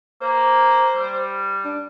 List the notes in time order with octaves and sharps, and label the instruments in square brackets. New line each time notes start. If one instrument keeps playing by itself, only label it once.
[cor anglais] A#3 [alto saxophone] C5
[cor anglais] G3
[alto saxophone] D4